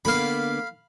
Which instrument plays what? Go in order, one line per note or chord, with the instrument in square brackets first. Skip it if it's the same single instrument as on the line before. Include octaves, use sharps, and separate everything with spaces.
[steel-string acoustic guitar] D3 A#3 B3 [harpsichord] F5 B5